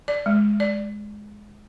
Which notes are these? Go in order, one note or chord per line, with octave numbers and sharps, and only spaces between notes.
D5
G#3
D5